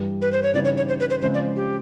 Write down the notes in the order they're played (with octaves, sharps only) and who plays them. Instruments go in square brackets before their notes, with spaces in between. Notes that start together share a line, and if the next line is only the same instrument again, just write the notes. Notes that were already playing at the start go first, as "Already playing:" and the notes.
Already playing: [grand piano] G2 E3 G3
[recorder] B4
C5
C#5
[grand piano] C#3 E3 G3 C4 D#4 [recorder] D5
[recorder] C#5
C#5
C5
B4
C5
[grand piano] C#3 F3 G#3 C4 F4 [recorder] C5
[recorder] D5
G4